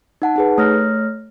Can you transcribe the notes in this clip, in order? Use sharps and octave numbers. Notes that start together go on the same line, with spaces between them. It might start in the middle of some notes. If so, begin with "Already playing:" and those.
D#4 F#5 A5
D#4 G#4 B4
A3 C#5 F6 A#6